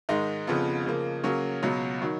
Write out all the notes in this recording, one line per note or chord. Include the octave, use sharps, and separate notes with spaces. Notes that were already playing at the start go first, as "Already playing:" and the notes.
G#2 D#3 G#3 D#4
F2 C#3 F3 B3
C#3 F3 A#3
C#3 F#3 A#3 C#4
C#2 B2 F#3
D#3 F#3